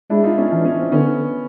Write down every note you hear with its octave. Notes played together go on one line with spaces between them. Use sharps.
G#3 D4 E4
D#4 F4
C#4 D#4
E3 D4
C#4
C4
D3 B3 C#4